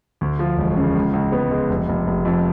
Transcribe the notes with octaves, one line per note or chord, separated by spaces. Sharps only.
D2
F3
E1
C#3
C#2
C#2
B3
G#3
F1
F1
F1
F2